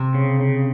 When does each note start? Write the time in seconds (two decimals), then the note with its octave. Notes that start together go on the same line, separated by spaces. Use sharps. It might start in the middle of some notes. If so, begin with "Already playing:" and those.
Already playing: C3
0.14 C#3
0.40 C#3